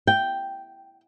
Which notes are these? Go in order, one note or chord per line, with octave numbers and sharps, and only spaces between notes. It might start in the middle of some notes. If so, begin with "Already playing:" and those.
G5